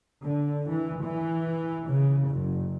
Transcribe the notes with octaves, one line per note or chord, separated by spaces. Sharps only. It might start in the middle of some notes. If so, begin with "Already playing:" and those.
D3
E3
E3
C#3
F#1